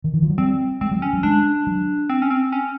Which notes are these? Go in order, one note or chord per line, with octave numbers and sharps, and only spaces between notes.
D#3
E3
F3
F#3
G3 C4
G#3 C4
F#3
C#4
F#3
G#3 D4
F#3
C4
C#4
C4
C#4